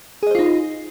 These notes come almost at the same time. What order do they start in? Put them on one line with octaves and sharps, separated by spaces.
G#4 D#5 C5 F4 D#4